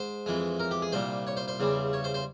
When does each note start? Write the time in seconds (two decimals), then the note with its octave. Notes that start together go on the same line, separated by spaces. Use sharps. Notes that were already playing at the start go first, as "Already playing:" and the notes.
Already playing: G#2 C5
0.26 F2 E3 G#3
0.60 A#4
0.71 G4
0.82 G#4
0.92 C2 A#2 G3 C5
1.27 C#5
1.37 C5
1.48 C5
1.60 E2 C#3 G3
1.93 C#5
2.04 C5
2.14 C5